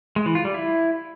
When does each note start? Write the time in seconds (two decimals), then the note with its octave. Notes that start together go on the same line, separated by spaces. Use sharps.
0.16 G#3
0.26 E3
0.35 F4
0.45 G3
0.54 E4